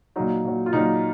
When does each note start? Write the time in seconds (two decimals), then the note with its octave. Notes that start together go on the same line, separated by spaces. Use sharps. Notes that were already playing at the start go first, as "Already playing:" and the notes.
0.16 A#2 F#3 D#4
0.44 A#2 F#3
0.66 F4
0.73 A#2 F#3 D#4